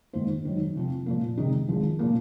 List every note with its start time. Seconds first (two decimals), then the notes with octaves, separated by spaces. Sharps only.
0.13 G#2 D#3 A#3 F4 C5
0.44 G#2 D#3 F#3
0.75 C3 F3 C4
1.06 A#2 F3 A#3
1.37 C3 D#3 G#3 D#4
1.68 G#1 G#2 F3 G#3
1.99 A#2 F3 A#3